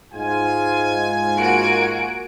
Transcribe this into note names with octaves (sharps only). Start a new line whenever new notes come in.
G#2 F4 G#5
A#3 F#4 D7